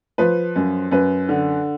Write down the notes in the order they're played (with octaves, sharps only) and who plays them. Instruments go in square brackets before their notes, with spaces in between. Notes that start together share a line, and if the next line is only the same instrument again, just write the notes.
[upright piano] F3 B4
F#2
F#2 B4
D3